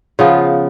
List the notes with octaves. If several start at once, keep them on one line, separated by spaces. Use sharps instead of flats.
C#3 F3 B3 F4